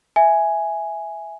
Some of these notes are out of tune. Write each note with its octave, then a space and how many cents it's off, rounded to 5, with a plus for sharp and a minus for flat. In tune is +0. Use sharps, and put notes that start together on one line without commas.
E5 +0 G#5 +0